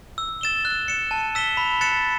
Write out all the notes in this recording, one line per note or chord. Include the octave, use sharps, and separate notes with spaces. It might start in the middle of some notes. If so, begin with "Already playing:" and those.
E6
A6 E7 G7
F#6
C#7 E7
A5
E6 B6 E7 G7
B5
F#6 A6 C#7 E7